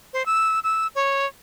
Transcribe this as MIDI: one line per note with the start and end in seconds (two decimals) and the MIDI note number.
0.13 0.25 72
0.26 0.59 88
0.64 0.87 88
0.95 1.26 73